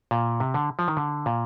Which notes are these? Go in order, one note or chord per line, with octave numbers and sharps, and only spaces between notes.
A#2
C3
D3
F3
D#3
D3
A#2